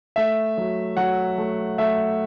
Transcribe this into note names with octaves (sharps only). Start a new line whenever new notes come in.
A3 E5
F#3
F#3 F#5
A3
A3 E5